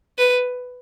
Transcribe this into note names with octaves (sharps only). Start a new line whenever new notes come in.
B4